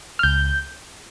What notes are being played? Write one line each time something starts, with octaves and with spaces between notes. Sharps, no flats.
F6
C#2 G6